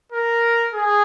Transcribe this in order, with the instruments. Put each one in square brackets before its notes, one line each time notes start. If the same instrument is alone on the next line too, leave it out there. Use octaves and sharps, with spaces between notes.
[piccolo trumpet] A#4
G#4